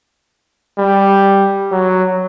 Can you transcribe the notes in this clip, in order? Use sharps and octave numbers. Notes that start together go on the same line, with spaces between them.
G3
F#3